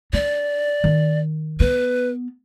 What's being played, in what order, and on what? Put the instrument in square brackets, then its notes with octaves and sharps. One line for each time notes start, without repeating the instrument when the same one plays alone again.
[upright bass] D4 [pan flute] D5
[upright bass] D#3
[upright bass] B3 [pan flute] B4